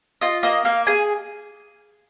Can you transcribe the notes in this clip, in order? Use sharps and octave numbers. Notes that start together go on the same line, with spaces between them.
F4 D#5
A#3 D#5
A#3 F5
G#4 G#5